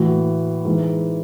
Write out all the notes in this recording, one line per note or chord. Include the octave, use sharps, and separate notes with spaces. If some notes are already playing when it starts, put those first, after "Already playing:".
Already playing: A2 E3 F#4
G#2 E3